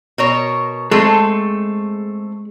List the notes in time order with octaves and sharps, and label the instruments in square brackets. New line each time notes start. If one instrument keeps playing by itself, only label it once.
[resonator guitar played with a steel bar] B2 A#4 C#5
[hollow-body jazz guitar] G#3 [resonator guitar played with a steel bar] A3 C4 A4